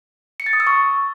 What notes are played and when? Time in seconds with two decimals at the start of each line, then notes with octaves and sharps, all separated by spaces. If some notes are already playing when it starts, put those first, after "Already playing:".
0.40 C#7
0.46 A6
0.53 D#6
0.60 E6
0.67 C#6